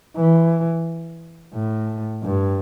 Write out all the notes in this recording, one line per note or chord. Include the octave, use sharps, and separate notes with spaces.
E3
A2
G2